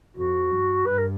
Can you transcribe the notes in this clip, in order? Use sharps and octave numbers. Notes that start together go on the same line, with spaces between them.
F2 F#4
G2
G2 B4
A#4